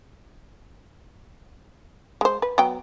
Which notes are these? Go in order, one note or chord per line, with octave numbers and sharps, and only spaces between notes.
G#3 C5
B4
F#3 B3 G5